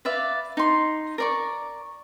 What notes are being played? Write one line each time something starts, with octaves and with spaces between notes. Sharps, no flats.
B4 D5 E5 F5
D#4 C6
A#4 D5 C#6